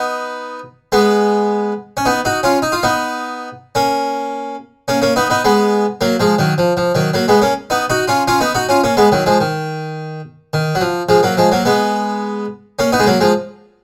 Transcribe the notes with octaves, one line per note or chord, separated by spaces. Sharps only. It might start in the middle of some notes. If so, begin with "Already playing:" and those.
Already playing: B3 D#4
G#3 B3
C#4
B3 D#4
D#4 F#4
C#4 F4
D#4
F4
B3 D#4
A#3 C#4
A#3 C#4
A#3 C#4
B3 D#4
B3 D#4
G#3 B3
F#3 A#3
F3 G#3
D#3 F#3
F3
F3
D#3 F#3
F#3 A#3
G#3 B3
A#3 C#4
B3 D#4
D#4 F#4
C#4 F4
C#4 F4
B3 D#4
D#4 F#4
C#4 F4
A#3 C#4
G#3 B3
D#3 F#3
F3 G#3
D#3
D#3
F#3
F3
F3 G#3
F#3 A#3
F3 G#3
F#3 A#3
G#3 B3
A#3 C#4
B3 D#4
G#3
F#3 A#3
F3 G#3